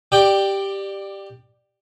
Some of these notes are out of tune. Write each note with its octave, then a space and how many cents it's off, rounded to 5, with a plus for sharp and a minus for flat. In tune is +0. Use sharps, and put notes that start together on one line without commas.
G4 +0 D5 +20 G5 +0